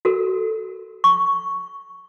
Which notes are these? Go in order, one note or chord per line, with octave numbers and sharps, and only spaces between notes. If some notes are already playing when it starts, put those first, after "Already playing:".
F#4 A4 A#4
C#6